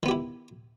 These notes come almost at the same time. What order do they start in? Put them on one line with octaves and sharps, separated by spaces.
D#3 B3 G4 E4